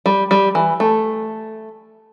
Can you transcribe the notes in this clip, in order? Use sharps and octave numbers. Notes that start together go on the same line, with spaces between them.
G3
G3
E3
A3